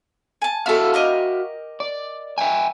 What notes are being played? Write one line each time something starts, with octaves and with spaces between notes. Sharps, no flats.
G#5 A5
B3 F#4 A4 E5 F5
G4 A#4 D#5
D5
E5 G5 G#5